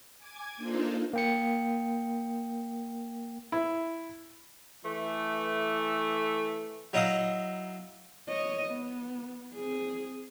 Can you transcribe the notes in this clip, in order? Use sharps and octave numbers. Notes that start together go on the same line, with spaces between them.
G#5 D6 G#6
A#3 D4 D#4 F4 A4 C5
A#3 G5 C#7
E4
E3 A3
F#3 D#4 E4 F5 D#6
C#5 D#5
B3
C4 G#4